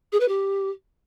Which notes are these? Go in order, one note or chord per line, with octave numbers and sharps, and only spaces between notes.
G#4
B4
G4